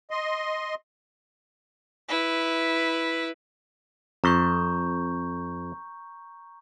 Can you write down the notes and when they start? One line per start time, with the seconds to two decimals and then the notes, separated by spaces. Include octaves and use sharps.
0.11 D#5 C6
2.08 E4 B4
4.24 F2 A#5 C#6 G6